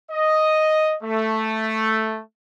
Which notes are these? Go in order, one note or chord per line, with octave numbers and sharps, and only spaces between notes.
D#5
A3